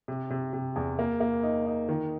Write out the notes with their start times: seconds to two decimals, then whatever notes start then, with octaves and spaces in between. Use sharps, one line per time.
0.08 C3
0.30 C3
0.53 C3
0.76 E2
0.99 A#3
1.20 A#3
1.43 D#4
1.66 D#4
1.89 D#3